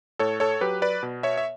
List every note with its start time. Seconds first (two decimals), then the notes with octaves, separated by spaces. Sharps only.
0.19 A2 A4 C#5
0.40 A4 C#5
0.61 F#3 G4 B4
0.82 B4 D5
1.03 B2
1.23 C#5 E5
1.37 E5